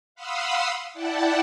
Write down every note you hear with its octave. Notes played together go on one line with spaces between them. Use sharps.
F5 F#5 B5 C6 D#6 E6
E4 D5 F#5 G5 A5